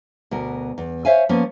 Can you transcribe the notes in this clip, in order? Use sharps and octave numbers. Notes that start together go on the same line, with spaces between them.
D2 B2 A#4
E2
C5 C#5 E5 F5 G#5
F3 A#3 B3 C#4